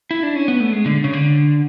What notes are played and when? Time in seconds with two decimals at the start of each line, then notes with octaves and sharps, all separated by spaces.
0.11 E4
0.23 D4
0.36 C#4
0.48 B3
0.60 A3
0.73 G#3
0.86 D3
1.04 C#3
1.13 D3